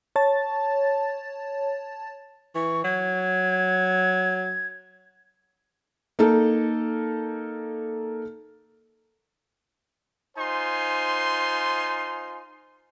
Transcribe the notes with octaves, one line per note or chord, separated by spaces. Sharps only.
C#5 A5 A6
E3 C#6
F#3 G#6
A#3 D#4 A4
D#4 F4 C5 G#5 C6